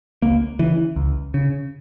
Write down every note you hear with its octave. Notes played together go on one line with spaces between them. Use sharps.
C#2 A#3
C#3 E3
C#2
C#3